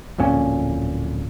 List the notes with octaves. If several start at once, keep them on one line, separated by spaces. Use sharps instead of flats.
D1 F2 A#2 C#4